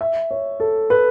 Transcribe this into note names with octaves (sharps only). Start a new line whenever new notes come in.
E5
C#5
A4
B4